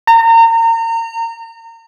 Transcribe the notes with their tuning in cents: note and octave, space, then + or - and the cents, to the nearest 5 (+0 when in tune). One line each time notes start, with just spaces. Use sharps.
A#5 -30